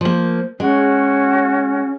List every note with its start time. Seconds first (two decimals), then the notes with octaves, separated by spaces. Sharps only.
0.01 F3 A#3 C5
0.60 G#3 C#4 F#4